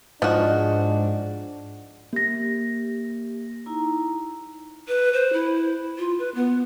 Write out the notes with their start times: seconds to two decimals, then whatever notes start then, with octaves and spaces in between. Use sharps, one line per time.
0.22 G#2 F3 D4 F#4 D#5
2.13 A#3 G4 A#6
3.66 D#4 E4 A#5
4.88 B4
5.13 C5
5.33 E4
5.98 F4
6.19 B4
6.35 B3